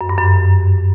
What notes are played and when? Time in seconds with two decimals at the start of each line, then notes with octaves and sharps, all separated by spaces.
0.01 F#2
0.09 G2
0.18 F#2